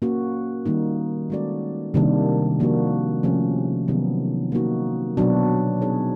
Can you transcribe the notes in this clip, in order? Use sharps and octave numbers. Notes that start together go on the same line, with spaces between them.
A#3 C#4 F#4
D#3 G3 A#3 D#4
G#3 C#4 F#4 A4 D5
C3 D#3 G3 A#3 D4
F3 A#3 D4 F#4
C3 F3 A3 C#4
C3 D#3 F#3 B3 D#4
A#3 D#4 F#4
B2 F#3 B3 D4 F#4
C4 D#4 G#4 C#5